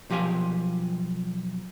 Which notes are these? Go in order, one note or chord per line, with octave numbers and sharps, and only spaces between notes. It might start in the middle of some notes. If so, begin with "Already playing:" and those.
B1 F3 G4 F5 G#5